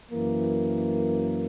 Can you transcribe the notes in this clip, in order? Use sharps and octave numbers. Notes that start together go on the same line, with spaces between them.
F#2 E3 A#3